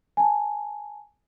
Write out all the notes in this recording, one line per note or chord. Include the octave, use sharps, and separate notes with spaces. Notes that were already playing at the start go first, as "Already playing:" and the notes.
G#5 A5